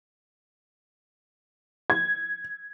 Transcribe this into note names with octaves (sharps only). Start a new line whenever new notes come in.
G#6